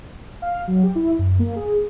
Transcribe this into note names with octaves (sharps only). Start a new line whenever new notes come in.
F5
F#3
G4
E4
F#2
A#3
G#4